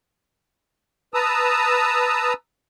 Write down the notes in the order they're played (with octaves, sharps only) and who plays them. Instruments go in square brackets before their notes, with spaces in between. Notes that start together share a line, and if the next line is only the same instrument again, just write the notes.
[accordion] B4 A5 A#5 D#6 E6